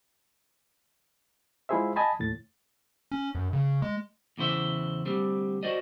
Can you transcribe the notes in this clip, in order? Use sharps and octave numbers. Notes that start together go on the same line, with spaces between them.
G#3 E4 F4 G#4 C5 E5
D#5 G#5 A5 B5
D#2 A2 A6
C#4
F#2
C#3
G#3
E2 C#3 E4 C5 E5
D2 G3 C4
F#4 C5 D5 D#5